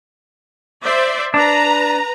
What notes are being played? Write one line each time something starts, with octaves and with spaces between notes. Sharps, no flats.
C5 D5 E5
D4 B4 A#5